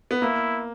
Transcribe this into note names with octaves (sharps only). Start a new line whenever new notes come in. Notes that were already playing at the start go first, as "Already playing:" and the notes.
B3
A#3 E4